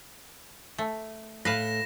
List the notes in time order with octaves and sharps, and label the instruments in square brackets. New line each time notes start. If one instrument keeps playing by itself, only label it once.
[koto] A3
[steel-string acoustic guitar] A2 [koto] B4 F5 [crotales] A#6 E7